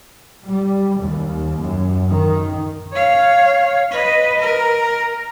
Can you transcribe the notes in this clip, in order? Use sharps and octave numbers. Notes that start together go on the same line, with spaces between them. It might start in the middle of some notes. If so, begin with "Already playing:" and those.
G3
D#2
F#2
D#3
C#5 F5
B4 D#5
A#4